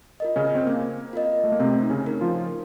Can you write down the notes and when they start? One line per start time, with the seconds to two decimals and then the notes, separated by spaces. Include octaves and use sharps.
0.20 F4 A#4 D#5
0.36 C#3 C#4
0.55 C4
0.67 A#3 C4
1.13 F4 A#4 D#5
1.44 A3
1.52 A#3
1.59 C3 A3 C4
1.83 D#4
1.90 C#3 C#4
2.06 D#4 A#4
2.21 F3 F4